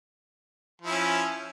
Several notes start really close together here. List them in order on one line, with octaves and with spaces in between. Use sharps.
F3 E4 C#4